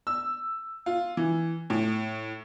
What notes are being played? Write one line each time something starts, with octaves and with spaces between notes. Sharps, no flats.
E6
F4
E3
A2